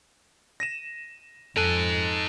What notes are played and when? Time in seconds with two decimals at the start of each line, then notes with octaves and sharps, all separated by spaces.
0.60 A#6 D#7 E7
1.57 F2 D#4 A4 G#5 A5 F#6